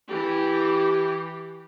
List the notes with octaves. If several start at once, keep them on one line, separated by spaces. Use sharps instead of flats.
E3 G4